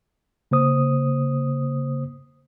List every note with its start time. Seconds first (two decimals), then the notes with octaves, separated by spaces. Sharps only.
0.51 C#3 A#3 C5 D#6